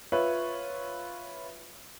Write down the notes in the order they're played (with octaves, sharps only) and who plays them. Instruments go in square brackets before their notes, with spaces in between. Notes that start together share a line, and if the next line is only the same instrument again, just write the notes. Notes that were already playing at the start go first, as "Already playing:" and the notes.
[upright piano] F4 B4 C#5 E5